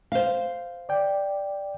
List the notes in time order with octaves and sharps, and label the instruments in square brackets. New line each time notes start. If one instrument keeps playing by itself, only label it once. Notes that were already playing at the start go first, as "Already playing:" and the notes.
[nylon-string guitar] C5 F5
[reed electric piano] D5 G5